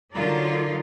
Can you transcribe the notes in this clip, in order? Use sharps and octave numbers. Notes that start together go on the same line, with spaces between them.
D3 F#3 D#4 F4 A#4 D5